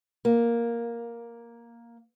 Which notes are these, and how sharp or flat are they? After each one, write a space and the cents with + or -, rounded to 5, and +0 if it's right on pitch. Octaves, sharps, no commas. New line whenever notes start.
A#3 +5